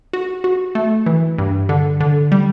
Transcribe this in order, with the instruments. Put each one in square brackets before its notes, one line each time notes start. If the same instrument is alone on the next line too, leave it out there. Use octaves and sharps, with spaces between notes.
[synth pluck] F#4
F#4
A3
E3
G2
D3
D3
G3